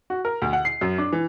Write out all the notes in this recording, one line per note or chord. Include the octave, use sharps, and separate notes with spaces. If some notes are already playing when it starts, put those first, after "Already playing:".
F#4
A#4
D2
F#5
C7
F#2
D4
E3